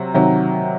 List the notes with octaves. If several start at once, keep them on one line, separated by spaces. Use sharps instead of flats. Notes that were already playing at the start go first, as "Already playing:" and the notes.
Already playing: C3 F#3
C3 D#3 F#3